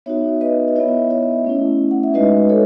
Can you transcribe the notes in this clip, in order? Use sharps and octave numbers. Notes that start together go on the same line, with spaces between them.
B3 D#4 F#4 C#5 E5
B4 D#5
D#5
B3 E4 C#5 E5
C#5 E5
A3 C#4 E4
F#5
E5
G#3 D#4 F#4 B4 D#5
A4 C#5